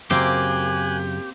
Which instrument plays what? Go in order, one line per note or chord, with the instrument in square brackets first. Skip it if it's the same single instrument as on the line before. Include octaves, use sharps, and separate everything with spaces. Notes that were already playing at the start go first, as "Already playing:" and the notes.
[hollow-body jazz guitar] F#2 C#3 [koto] A#3 C4 [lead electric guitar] G4 [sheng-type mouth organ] G#5 F#6